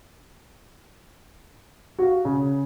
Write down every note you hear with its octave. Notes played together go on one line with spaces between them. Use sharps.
F#4 F5
C#3